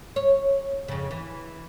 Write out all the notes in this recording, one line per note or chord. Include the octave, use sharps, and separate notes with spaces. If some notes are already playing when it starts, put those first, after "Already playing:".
C#5
F2 C#3
E3